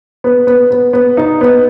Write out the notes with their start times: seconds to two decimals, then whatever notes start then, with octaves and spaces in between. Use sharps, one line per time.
0.24 B3
0.47 B3
0.70 B3
0.93 B3
1.17 D#4
1.41 B3